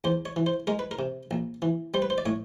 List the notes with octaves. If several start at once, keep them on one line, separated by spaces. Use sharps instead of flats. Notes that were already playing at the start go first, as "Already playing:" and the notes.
E2 C5
C#5
E3
C5
G#3 A#4
B4
A#4
C3
A#1
E3
G3 C5
B4
C5
D5
A2 C#5